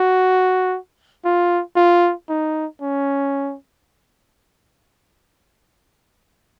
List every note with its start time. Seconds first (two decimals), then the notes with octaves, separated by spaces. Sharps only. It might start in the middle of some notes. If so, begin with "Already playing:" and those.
Already playing: F#4
1.24 F4
1.76 F4
2.29 D#4
2.81 C#4